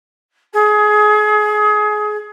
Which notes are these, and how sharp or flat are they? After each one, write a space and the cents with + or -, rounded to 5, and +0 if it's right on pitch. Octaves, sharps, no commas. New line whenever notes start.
G#4 +25